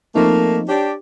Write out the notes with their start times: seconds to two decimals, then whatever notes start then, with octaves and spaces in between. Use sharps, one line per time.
0.15 F3 A3 A#3 C4 D#4
0.69 D4 G4 C#5